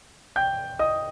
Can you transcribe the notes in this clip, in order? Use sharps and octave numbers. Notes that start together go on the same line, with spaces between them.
G5 G6
D#5 D#6